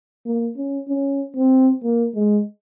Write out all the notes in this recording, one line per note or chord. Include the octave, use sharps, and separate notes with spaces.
A#3
C#4
C#4
C4
A#3
G#3